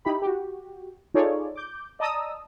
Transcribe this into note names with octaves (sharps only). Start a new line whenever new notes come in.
D#4 E4 G4 B5
F#4 G4
D#4 F4 G#4 A4 C#5 D5
D6 G6
D5 D#5 A5 A#5 D#6 E6